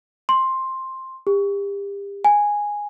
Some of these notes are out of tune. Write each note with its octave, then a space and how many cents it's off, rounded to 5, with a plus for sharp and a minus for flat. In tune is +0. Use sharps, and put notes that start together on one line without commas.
C6 +10
G4 +35
G#5 -5